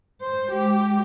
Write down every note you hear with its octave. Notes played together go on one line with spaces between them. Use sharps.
C5
G#3 G4